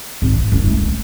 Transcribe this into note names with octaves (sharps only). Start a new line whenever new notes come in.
G#1
E3
F#1
A3
A3